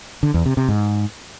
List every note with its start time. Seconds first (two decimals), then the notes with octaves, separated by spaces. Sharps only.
0.23 D3
0.34 E2
0.46 C3
0.57 C3
0.69 G#2